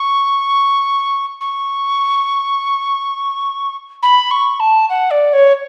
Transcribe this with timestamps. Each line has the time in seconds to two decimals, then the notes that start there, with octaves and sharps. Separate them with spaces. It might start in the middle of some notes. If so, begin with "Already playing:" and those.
Already playing: C#6
1.40 C#6
4.02 B5
4.31 C#6
4.59 A5
4.89 F#5
5.10 D5
5.33 C#5